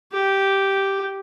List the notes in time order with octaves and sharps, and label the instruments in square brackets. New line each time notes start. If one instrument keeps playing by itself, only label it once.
[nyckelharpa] G4